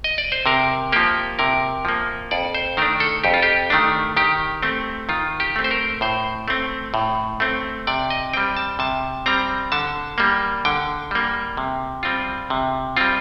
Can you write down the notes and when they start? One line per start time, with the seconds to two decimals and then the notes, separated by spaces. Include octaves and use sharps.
0.04 D#5
0.18 D5
0.32 C5
0.46 C3 A#4
0.92 F3 A#3 G4
1.39 C3 A#4
1.85 F3 A#3
2.31 F2 D5
2.55 C5
2.77 D#3 A3 D4 A#4
3.00 A4
3.24 F2 G4
3.34 F4
3.42 G4
3.70 D#3 A3 D4
4.17 D#3 G4
4.63 A3 C4
5.09 D#3 F4
5.40 G4
5.56 A3 C4
5.64 C5
5.71 A#4
6.01 A2 C5
6.48 A3 C4
6.94 A2
7.40 A3 C4
7.87 C3 D5
8.10 D#5
8.33 G3 C4 G5
8.57 A5
8.79 C3 A5
9.26 G3 C4 A#5
9.72 D3 A5
10.18 G3 A#3
10.65 D3 G5
11.11 G3 A#3
11.57 C3
12.03 G3 C4 F4
12.50 C3
12.97 G3 C4 F4